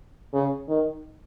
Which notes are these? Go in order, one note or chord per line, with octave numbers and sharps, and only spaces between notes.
C#3
D#3